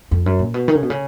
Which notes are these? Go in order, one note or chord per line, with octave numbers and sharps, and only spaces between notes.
F2
F#2
A#2
B2
D#3
C#3
B2
C#3